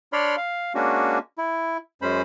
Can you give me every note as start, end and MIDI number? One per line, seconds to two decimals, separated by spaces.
0.13 0.36 62
0.13 0.36 73
0.13 0.36 74
0.13 0.36 83
0.13 0.36 84
0.13 0.36 89
0.37 0.73 77
0.75 1.18 56
0.75 1.18 58
0.75 1.18 61
0.75 1.18 62
0.75 1.18 66
1.38 1.77 64
2.02 2.22 42
2.02 2.22 56
2.02 2.22 61
2.02 2.22 72
2.02 2.22 83